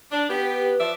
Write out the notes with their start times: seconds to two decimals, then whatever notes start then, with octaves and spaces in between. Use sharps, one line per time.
0.12 D4
0.29 B3 G4
0.42 B4
0.79 F3 D5 E5